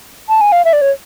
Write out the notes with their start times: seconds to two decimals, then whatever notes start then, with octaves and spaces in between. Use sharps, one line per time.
0.29 A5
0.41 G#5
0.52 F5
0.65 E5
0.73 D5
0.81 C#5